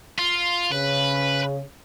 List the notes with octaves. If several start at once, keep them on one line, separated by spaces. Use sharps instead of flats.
F4
C#3 B4